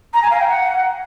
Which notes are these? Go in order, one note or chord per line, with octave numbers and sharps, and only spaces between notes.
A#5
G#5
F5
G5
F#5